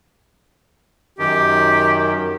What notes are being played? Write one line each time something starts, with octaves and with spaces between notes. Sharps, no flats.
F#2 D#3 G4